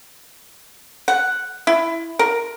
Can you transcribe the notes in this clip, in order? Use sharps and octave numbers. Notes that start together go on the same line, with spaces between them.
F#5
E4
A#4